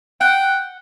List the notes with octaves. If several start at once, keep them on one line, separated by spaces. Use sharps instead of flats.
F#5 G5